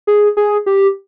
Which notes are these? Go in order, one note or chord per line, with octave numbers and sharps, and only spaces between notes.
G#4
G#4
G4